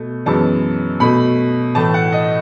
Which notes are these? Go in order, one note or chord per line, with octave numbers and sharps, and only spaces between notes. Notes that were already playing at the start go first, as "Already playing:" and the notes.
Already playing: B2 A3
F#2 E3 G#3 B3 A5
B2 A3 B5
A2 E3 A3 A5
F#5
D#5